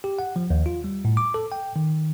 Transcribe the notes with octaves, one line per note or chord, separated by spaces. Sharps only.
G4
F#5
F3
D#2
F4
G3
A2
D6
A4
G5
D#3